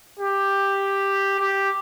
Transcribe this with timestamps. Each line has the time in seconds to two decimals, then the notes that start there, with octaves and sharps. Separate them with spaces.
0.19 G4
1.39 G4